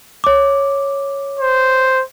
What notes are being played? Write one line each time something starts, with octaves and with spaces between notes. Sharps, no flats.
C#5 D6
C5